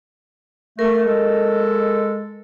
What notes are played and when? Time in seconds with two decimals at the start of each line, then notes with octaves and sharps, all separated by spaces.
0.79 A3 A#4
1.06 G#3 A4